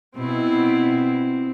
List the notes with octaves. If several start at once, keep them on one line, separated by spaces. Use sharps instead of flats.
B2 C4 E4